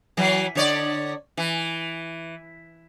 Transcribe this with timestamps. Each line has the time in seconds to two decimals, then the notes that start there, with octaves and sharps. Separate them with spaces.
0.17 E3 F#3
0.55 D3 C#5 D5
1.37 E3